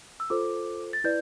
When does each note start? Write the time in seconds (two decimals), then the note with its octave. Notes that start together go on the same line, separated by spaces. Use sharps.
0.20 E6
0.30 F4 A4 C5 D6
0.93 A6
1.04 E4 B4 D5 G6